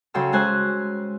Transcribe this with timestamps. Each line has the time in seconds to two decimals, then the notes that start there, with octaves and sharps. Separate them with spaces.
0.14 C#3 F#3 A4 G5 C6 E6
0.32 G#3 C#4 C5 G#5 F#6